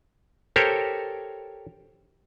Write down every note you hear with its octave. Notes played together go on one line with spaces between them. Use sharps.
G4 A4 A#4 C5 C#5